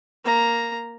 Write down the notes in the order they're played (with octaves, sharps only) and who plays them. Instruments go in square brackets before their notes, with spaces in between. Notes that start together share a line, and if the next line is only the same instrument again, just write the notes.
[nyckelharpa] A#3 A#5